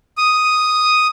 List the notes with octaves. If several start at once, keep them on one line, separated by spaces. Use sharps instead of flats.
D#6